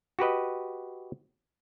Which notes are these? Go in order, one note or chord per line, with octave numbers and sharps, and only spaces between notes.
F#4 G4 B4 D#5